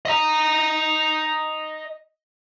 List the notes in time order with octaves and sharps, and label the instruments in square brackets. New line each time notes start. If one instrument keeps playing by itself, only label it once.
[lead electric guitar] D#5 A#5